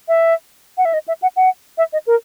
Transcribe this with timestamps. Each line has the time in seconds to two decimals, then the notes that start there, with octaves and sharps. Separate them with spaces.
0.08 E5
0.78 F#5
0.85 E5
0.94 D#5
1.08 E5
1.22 F#5
1.36 F#5
1.78 E5
1.93 D#5
2.07 A#4